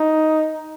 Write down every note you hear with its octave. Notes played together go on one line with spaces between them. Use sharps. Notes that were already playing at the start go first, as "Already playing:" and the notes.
Already playing: D#4